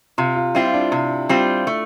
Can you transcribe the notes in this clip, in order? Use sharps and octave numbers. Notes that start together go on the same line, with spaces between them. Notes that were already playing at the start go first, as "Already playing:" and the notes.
C3 F4
F4
G3 C4 E4 F4
D4
C3
G3 C4 F4
A3